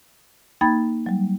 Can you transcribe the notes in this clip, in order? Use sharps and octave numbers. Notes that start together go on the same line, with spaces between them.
A#3 D#4 G5 B5 G#6 A6
F#3 G3